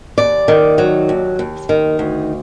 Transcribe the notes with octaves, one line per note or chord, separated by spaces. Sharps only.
D#2 D5
D#3
F#3
D#2
D#2
D#3
D2